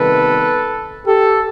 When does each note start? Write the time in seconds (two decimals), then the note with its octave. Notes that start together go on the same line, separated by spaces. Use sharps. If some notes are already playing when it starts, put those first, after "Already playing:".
Already playing: C3 D#3 G3 B3 A4 B4
1.06 G4 A4